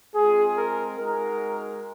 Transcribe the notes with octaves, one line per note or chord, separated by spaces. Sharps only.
G#3 C4 F4 G#4
A#4
G#3 D#4 F#4 A#4